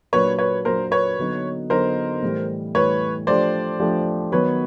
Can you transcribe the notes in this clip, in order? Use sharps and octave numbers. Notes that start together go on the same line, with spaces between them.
A#2 F#3 A#3 D4 B4 C#5
B4 C#5
A#2 F#3 A#3 D4 A#4 C5
B4 C#5
D3 F#3 B3 D#4
D3 F#3 B3 D#4 A#4 C5
A2 E3 G3
A2 E3 G3 B4 C#5
F3 A3 D4 G4 C5 D5
F3 A3 D4 G4
D#3 F#3 B3 B4 C#5